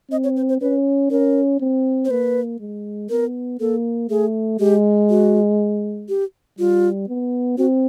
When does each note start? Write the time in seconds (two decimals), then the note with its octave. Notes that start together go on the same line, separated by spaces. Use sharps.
0.11 C4 D#5
0.24 C#5
0.37 C5
0.49 C5
0.61 C#4 B4
1.11 C#4 A#4
1.61 C4
2.05 C5
2.11 A#3 B4
2.60 G#3
3.10 B3 A#4
3.60 A#3 A4
4.10 A3 G#4
4.59 G#3 G4
5.10 F#4
6.09 G4
6.59 G3 F4
7.08 B3
7.58 C4 F#4